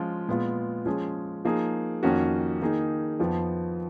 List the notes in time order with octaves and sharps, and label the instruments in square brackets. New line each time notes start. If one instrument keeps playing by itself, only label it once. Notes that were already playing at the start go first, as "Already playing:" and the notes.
Already playing: [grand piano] F3 G#3 C#4 F4
A#2 G#3 B3 F4
F3 G#3 C#4 G#4
F3 A#3 D#4 G#4
F2 D#3 A#3 C#4 F#4
D#3 A#3 D#4 G#4
F2 F3 B3